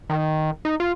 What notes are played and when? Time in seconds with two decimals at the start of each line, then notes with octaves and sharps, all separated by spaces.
0.10 D#3
0.65 D#4
0.80 F4